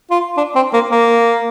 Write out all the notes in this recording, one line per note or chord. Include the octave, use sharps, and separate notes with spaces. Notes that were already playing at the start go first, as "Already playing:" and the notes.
F4
D4
C4
A#3
A#3